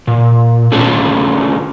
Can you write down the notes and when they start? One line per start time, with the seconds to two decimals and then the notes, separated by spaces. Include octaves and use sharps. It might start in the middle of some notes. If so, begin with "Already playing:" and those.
0.07 A#2
0.72 A3 C#4 D4 F4 G#4 A5